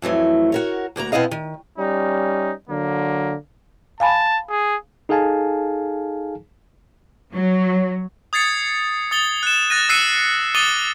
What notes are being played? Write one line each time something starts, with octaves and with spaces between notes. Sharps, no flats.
F2 E3 F#3 A3
F#4 A#4 C#5
D2 A#3 F#4 A#5
B2 B3 C4 E4 D#5 F5
D#3
G3 C#4 D#4
D3 F#3 A#3
F5 G#5 A5 B5
G#4
D#4 G#4 A4 F5 G#5 A5
F#3
D#6 G#6 A6 C7 C#7
D#6 A6 G7
F#6 E7
F#6 A6 A#6 D#7
E6 F#6 C7 C#7 D#7
D6 D#6 A6 D#7 G7